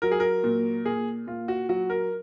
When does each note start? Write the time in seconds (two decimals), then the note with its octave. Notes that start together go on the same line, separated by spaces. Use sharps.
0.02 F#3 A#4
0.12 G#4
0.20 A#4
0.44 A#2
0.85 A#2 G#4
1.27 A#2 F4
1.48 F#4
1.69 F#3 F#4
1.90 A#4